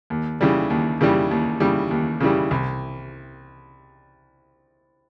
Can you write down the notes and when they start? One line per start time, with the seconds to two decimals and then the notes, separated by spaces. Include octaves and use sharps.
0.10 D#2
0.41 C#3 E3 G3
0.70 D#2
1.01 C#3 E3 G3
1.31 D#2
1.60 C#3 E3 G3
1.91 D#2
2.20 C#3 E3 G3
2.51 C2